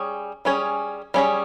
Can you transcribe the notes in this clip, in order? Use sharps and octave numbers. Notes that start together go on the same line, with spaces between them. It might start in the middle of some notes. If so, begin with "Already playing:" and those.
Already playing: G3 C#4 G#4 C#5
G3 C#4 G#4 C#5
G3 C#4 G#4 C#5